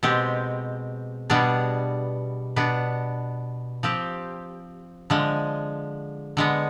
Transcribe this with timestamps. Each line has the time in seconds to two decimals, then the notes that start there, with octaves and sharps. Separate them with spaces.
0.03 B2 G#3 C4 G4
1.30 B2 G3 B3 D4 G#4
2.56 B2 B3 D4
3.83 F3 C4 G4
5.10 D3 F3 G#3
6.37 D3 G#3 B3